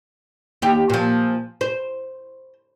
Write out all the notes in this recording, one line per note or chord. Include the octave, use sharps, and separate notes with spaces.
D#2 G4
A#2 F3
C5